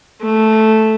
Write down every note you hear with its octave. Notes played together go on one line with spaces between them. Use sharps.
A3